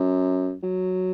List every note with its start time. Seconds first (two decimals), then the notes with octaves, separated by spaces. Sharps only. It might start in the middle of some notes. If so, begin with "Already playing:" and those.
Already playing: F#2
0.63 F#3